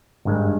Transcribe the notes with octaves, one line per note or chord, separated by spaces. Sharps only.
G#1 G2 D#3 G#3